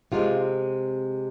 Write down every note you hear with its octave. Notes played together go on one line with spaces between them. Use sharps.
C3 G#3 C4 F4